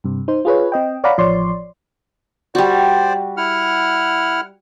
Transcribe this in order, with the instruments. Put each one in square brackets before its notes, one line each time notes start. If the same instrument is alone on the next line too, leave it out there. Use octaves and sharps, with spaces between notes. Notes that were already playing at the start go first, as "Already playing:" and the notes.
[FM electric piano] G2 C3
D#4 C5
F4 G#4 B4 C#5
C4 D#5 G5
C#5 D5 F5 F#5 A#5 B5
A1 F3 C#5 D5 C6
[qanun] G3 F#4 [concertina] C5 D5
[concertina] E4 F#5 F6